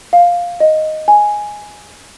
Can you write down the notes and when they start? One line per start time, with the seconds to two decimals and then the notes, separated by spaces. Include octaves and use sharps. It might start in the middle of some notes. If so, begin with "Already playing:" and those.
0.13 F5
0.60 D#5
1.08 G#5